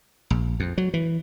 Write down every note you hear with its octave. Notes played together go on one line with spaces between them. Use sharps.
A#1
F2
F#3
E3